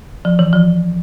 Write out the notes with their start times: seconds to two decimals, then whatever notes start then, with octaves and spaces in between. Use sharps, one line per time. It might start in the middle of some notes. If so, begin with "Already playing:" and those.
0.25 F3
0.39 E3
0.53 F3